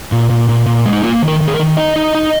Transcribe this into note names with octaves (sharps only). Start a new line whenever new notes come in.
A#2
A#2
A#2
A#2
G#3
D#4
A#3 F4
D#3
A#4
D#3
G#4
A#4
D#3
D#4 D#5
D#4
D#4